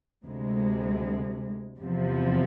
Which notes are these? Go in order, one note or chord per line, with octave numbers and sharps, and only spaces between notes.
D2 C3 G#3
E2 C3 F3